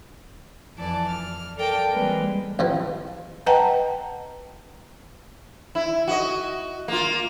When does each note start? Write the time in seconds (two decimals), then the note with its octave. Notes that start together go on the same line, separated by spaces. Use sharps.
0.78 F2 E3 D5 A5
1.10 F6
1.56 A4 A#4 D5 F5 G5 A5
1.91 E3 G3 G#3 A#3 C4 B4
2.59 A1 E3 F3
3.46 B4 D#5 F#5 G5 A5 A#5
5.75 E4
6.08 F#4 D#5
6.88 A#3 F4